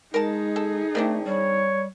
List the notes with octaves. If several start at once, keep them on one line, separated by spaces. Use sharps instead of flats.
G#3 D#4 G#4 A#4 A5
A4
D#3 A3 C4 D4
G3 C#5